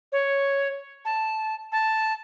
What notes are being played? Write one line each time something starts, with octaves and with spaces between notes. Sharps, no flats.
C#5
A5
A5